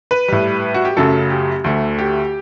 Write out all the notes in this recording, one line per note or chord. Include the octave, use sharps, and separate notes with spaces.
B4
A2 G3
F#4
G4
F#2 C#3 F#3 A3 A4
G4
D2 D3 A3
G4